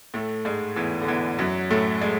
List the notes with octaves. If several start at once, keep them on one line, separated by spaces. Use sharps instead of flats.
A2 A3
G#2 G#3
E2 E3
D3
E2 E3
F#2 F#3
A2 A3
G#3